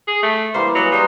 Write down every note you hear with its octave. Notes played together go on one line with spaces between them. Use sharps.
G#4
A3
E3 G3 A#3 C5
F#3 G#4 B4 D#5
G3 B4 A#5 C6